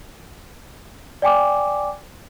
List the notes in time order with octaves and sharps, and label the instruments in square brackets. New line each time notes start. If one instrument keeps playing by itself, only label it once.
[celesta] D5 G5 G#5 D6